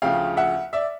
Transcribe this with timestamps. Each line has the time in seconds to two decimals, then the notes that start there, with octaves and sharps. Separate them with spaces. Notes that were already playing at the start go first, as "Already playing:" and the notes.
0.02 D2 C#3 F3 F5 G5
0.37 E5 F#5
0.73 D5 E5